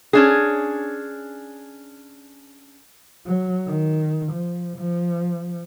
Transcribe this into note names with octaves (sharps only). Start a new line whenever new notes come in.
C#4 D4 G#4
F#3
D#3
F3
F3